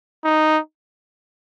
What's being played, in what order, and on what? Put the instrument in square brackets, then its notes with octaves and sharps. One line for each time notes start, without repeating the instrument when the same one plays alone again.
[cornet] D#4